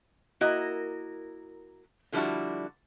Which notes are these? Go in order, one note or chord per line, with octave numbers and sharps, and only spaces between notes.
A#3 E4 F#4 A#4 D#5
D3 F3 G3 D4 E4 F#4